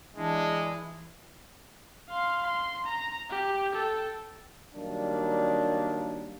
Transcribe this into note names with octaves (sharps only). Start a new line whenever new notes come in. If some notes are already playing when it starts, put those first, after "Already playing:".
E3 G#3 D4 E4
F5 C6
C6
A#5
G4
A4 G5
D#3 F#3 G3 A#3 D4